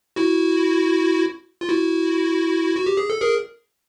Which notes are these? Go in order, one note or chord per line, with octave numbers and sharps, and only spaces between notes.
E4 F#4
F4
E4 F#4
F#4
G4
G#4
A4
G#4 A#4